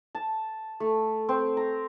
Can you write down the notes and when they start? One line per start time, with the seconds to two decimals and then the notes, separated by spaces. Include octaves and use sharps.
0.15 A5
0.80 A3
1.29 C4
1.57 A#5